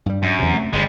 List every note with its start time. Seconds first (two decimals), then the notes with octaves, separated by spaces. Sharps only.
0.06 G2 G3
0.23 F#2
0.39 E2 C3
0.51 C3 A3
0.73 G1 G3 G#3